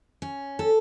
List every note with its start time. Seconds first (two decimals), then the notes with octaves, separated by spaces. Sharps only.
0.22 C#4
0.59 A4